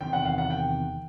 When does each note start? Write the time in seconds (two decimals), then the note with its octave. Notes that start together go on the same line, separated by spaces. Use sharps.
0.01 E2 C3 D#3 G5
0.13 F#5
0.25 F5
0.38 F#5
0.50 G5